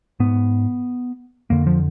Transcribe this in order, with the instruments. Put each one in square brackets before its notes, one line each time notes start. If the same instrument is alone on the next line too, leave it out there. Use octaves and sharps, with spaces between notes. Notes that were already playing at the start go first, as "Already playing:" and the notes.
[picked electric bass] G#2 B3
F2 D3 A#3
F3